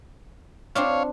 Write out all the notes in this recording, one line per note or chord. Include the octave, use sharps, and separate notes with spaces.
C4 D4 F4 C#5 F5